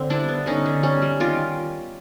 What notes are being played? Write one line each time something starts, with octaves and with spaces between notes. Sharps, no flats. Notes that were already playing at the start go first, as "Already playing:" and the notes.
Already playing: D3 C4
G3 D4 E4
B3
D3 C#4 D#4
D3
G3 C#4
G3
D#3 F4 G4